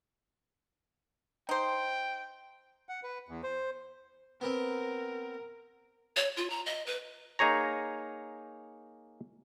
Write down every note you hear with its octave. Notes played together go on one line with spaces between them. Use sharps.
D#4 C5 G5
F#5
B4
E2
C5
B3 C4 A#4
C#5
F4
A#5
D#5
B4
A#3 D#4 G#4 C#5 A#5